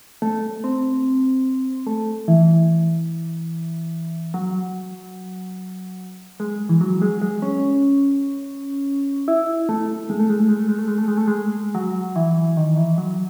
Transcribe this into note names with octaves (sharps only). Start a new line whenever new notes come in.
A3
C4
A3
E3
F#3
G#3
E3
F#3
G#3
G#3
C#4
E4
A3
G#3
A3
G#3
A3
G#3
A3
G#3
A3
G#3
A3
G#3
A3
G#3
F#3
E3
D#3
E3
F#3